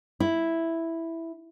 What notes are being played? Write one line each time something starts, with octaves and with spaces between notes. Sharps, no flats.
E4